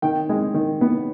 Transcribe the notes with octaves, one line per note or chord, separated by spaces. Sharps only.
D#3 G5
G#3
D#3
B3